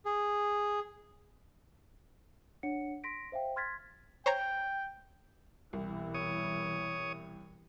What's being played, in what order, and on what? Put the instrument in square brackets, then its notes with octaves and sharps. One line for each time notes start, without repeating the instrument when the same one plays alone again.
[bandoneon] G#4
[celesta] D4 C#5 F#5 C#7
C6 A#6 B6 D7
C5 E5 F5 G5
C6 F6 G#6 A6 B6
[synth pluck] C5 C#5 A#5 [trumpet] G5
[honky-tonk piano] C2 [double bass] B2 E3
[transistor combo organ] C#5 D#6